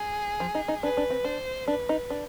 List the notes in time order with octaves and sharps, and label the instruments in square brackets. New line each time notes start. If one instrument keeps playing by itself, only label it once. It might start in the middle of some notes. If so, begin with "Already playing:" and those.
Already playing: [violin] G#4
[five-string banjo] F3
D#4
D#4
[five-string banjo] D4 [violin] B4
[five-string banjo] D4
C4
[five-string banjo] D4 [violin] C5
[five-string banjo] D4 [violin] B4
[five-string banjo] D#4
D4